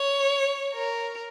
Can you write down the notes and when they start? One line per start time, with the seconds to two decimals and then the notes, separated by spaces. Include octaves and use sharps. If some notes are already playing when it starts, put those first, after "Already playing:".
Already playing: C#5
0.74 A#4